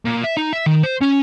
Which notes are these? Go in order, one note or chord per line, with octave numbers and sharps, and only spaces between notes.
A#2
E5
D#4
E5
D#3
C5
C#4